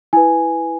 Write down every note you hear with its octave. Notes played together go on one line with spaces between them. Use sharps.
E4 B4 G#5